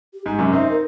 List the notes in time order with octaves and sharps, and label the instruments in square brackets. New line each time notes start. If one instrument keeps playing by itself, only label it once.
[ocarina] G4
[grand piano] G#2 [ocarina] G4
[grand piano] F#2 C3
[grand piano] C4 D#4 [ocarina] E5
[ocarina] A#4